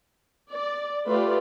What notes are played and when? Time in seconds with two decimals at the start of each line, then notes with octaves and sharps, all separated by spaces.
0.51 D5
1.07 A3 F4 G4 B4 D5